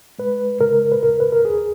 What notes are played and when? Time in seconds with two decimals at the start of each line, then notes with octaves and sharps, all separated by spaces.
0.19 G#3 B4
0.60 C#3 A#4
0.92 B4
1.03 D#2 A#4
1.20 B4
1.33 A#4
1.45 D#2 G#4